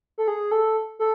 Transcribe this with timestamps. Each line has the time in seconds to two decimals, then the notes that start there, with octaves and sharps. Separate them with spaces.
0.18 A4
0.28 G#4
0.51 A4
0.99 A4